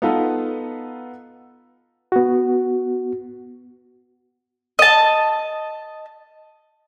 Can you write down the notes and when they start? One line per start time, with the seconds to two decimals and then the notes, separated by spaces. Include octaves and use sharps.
0.02 B3 D#4 F4 A4 B4 F5
2.12 B3 F#4
4.79 D#5 A5